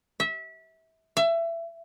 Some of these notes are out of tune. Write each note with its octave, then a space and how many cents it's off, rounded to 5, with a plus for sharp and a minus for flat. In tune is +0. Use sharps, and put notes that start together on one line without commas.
E5 -25
E5 +25